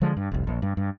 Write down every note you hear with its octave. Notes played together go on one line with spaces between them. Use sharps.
D3 F3 G#3
G2
F1 C2
A#1
G2
G2